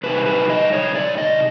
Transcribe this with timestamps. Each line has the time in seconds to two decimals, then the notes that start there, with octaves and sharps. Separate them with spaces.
0.03 C3 D#3 G3 B4
0.26 B4
0.50 D#5
0.73 C#5
0.95 D5
1.18 D#5